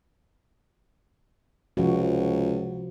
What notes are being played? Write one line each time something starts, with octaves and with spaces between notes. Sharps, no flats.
C#2 C3 F3 F#4